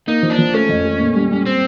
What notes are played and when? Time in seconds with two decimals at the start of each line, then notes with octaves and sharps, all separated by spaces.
0.07 A#3 D#4
0.23 F3
0.30 D4
0.39 F3
0.54 A3 C#4
0.69 F2
0.85 A3
0.99 A#2
1.15 G3
1.31 G3
1.46 C4